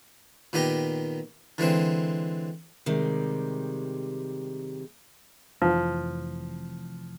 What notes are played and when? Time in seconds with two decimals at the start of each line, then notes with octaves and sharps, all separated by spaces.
0.53 A#2 D#3 B3 G4 A#5
1.58 D3 E3 G#3 C4
2.86 C3 D#3 G3 G#3
5.62 F1 F2 E3 F3